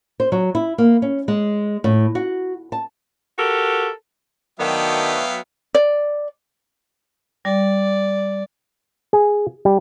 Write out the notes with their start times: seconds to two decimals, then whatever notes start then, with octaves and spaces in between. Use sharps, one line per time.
0.20 C5
0.32 F#3
0.55 E4
0.78 A#3
1.02 C#4
1.28 G#3
1.84 A2
2.15 F#4
2.72 A5
3.39 F#4 G4 A4 A#4
4.60 D#3 F#3 A3 B3 D4 E5 F5 G5
5.74 D5
7.45 G3 D5
9.13 G#4
9.65 G3